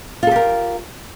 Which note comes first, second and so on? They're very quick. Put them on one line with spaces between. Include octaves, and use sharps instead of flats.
F4 A4 G4 A#4